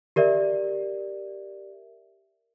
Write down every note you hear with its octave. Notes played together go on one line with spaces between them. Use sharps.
G4 A#4 D5 E5